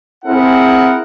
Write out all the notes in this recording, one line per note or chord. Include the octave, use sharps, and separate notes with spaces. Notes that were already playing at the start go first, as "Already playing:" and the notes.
C4 E4 G#4 A#4 F#5